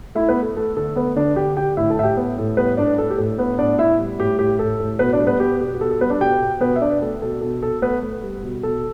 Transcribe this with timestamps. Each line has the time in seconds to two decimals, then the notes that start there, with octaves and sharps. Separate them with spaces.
0.15 A3 E4 E5
0.29 B3 B4
0.36 A3
0.42 A4
0.57 A3 A4
0.77 D3 A4
0.96 A3 B3 B4
1.16 D3 D4 D5
1.36 D3 G4 G5
1.57 D3 G4 G5
1.77 A2 E4 E5
1.90 A4 A5
1.97 A2 E5
2.03 G4 G5
2.17 B3 B4
2.38 A2 A4
2.57 G3 B3 B4
2.77 A2 D4 D5
2.98 A2 A4
3.10 G4
3.18 A2 A4
3.38 B3 B4
3.58 A2 D4 D5
3.79 B3 E4 E5
3.99 G3
4.20 A2 G4
4.39 A2 G4
4.59 A2 A4
4.79 A2
4.99 B2 B3 B4
5.13 D4 D5
5.19 G3
5.26 B3 B4
5.40 B3 G4
5.60 B2 G4
5.75 G4
5.80 B2 A4
5.91 A4
6.00 G3 B3 B4
6.10 D4 D5
6.21 B2 G4 G5
6.41 B2
6.60 B2 B3 B4
6.76 E5
6.81 B2 D4 D5
7.01 A3 A4
7.22 B2 A4
7.41 B2 A4
7.62 B2 A4
7.82 A3 B3 B4
8.03 A3
8.22 G3
8.43 B2
8.63 B2 A4